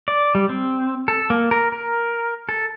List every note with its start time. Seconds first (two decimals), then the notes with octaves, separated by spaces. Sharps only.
0.08 D5
0.35 G3
0.49 C4
1.08 A4
1.30 A#3
1.51 A#4
1.72 A#4
2.49 A4